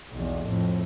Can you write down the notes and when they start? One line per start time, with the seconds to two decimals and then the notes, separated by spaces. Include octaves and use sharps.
0.12 B1 E2
0.46 F2 A2